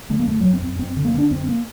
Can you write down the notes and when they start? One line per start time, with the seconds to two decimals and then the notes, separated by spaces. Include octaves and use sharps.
0.10 D3 A3
0.20 A#3
0.27 F#2 A3
0.40 F#2 F#3
0.53 C4
0.62 F#2
0.79 F#2 C4
0.97 D3
1.05 A#3
1.14 D3 D4
1.31 F#2 C4
1.48 A#3